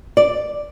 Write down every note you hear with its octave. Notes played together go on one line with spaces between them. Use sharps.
D5